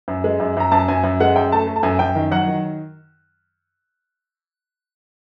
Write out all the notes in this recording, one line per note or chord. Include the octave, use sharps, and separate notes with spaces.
F#2
G#3
F#2
F#2 A#5
F#2 A5
F#2 G#5
F#2
G#3 F#5
F#2 G5
A3 A5
A3
A5
F#2 G#5
F#2 G5
D#3
F#3 F#5
D#3